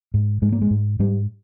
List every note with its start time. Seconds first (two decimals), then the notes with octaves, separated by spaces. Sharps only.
0.14 G#2
0.42 G#2 G#3
0.52 A#3
0.62 G#3
0.71 G#2
0.99 G#2 G3